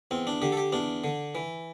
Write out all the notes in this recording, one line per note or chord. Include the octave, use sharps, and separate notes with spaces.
E2 C4
D4
D3 G4
A4
G4
E2 D4
D3
E3